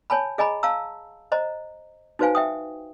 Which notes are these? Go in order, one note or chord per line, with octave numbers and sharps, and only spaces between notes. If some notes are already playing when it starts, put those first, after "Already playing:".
C#5 G#5 A5 B5
G#4 D#5 G#5 A#5 B5
F5 A5 A#5 E6
C5 D#5 A#5
D#4 F#4 B4 C5 F5 G#5
E5 G5 D#6